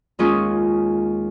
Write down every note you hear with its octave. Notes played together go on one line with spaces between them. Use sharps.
D#2 G#3 C#4 F4 G#4 C#6